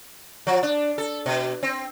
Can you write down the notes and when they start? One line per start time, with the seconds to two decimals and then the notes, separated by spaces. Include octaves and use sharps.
0.47 F3
0.63 D4
0.98 A4
1.26 B2
1.63 C4